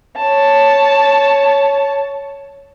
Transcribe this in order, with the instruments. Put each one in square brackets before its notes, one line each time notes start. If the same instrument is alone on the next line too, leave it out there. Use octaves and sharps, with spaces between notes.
[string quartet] C#5 A5